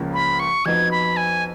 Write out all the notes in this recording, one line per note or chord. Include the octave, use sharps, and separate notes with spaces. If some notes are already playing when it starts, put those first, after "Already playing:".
Already playing: C#2 C#3 F3 A#3 F4
B5
C#6
F2 F3 B3 D#4 F#4 G#6
B5
G#5